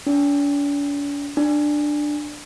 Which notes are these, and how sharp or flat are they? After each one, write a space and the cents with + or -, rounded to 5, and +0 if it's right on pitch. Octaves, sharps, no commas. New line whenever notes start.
D4 -45
D4 +10